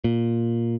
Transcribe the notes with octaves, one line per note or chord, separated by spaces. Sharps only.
A#2